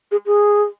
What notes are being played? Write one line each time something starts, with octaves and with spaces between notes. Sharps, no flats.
G#4
G#4